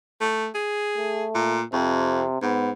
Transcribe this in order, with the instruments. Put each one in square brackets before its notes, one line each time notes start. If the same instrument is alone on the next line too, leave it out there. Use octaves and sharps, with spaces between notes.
[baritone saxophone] A3
G#4
[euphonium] A3
[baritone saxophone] A#2
[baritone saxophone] F2 [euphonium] C3
[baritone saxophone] G#2 [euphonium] B3